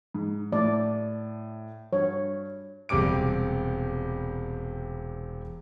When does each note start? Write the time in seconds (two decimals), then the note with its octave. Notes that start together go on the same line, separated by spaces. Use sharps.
0.14 G#2
0.52 A2 D5
1.93 G2 C#5
2.89 E1 C3 G3 D6 D7